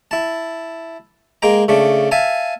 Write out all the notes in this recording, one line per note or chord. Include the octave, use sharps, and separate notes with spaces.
E4 A5
G#3 A#3 G5 A#5
C#3 A3 D4
E5 F5 G#5 A5